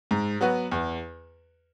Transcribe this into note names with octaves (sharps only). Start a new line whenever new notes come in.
G#2
F#3 B3 F#4 B4
E2